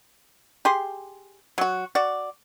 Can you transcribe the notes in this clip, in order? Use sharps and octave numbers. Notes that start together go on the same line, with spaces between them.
G4 G#4 C6
F#3 F#4
F#4 D5